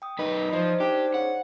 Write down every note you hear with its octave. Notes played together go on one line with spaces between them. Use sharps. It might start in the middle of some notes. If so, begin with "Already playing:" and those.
G5 D#6
F#2 D#4 B4
F3 C5 D5 D#5
D4 D#4 G4 C5 D5
C#3 F#5